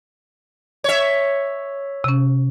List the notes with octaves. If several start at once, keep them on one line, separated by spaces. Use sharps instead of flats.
C#5 E5
C3 C#4